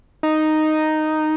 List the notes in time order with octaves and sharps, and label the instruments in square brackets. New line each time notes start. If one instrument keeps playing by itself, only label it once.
[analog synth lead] D#4